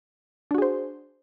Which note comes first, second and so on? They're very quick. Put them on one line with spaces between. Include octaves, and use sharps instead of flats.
D4 F#4 G#4 C5